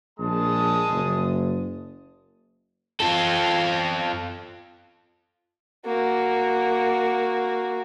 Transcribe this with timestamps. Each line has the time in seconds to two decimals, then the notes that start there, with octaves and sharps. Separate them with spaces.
0.19 A#1 G#3 A5 D#6
0.90 F#1
3.00 F4 A4
5.86 A#3 F#4